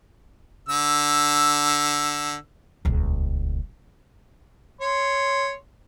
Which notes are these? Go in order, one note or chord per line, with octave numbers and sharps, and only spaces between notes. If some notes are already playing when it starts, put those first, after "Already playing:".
D3 E6
D#1 C#2
C#5 C6